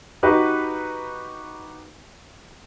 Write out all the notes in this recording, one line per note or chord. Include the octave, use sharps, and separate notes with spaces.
D#4 F#4 G4 B4 D#5